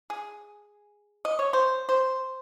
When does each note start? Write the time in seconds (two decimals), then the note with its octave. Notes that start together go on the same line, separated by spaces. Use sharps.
0.10 G#4
1.25 D#5
1.39 C#5
1.53 C5
1.89 C5